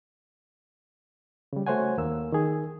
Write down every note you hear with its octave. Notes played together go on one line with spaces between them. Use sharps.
C#3 G3
A3 F#4 C5 C#5 F#5 G#5
D#2 A#3 E6
D#3 G#4